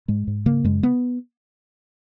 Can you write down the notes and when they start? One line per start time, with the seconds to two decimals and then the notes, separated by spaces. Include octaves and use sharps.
0.08 G#2 G#3
0.27 G#2
0.46 C#3 A#3
0.64 F#2 G#3
0.83 B3